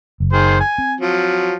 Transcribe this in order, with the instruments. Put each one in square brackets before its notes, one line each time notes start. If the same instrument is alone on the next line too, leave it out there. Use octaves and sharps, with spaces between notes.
[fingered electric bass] F#1
[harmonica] D#3 G#4 C5
G#5
[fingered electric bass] C4
[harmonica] F3 F#3